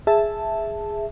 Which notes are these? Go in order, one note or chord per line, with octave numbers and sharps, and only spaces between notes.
G#4 E5 A5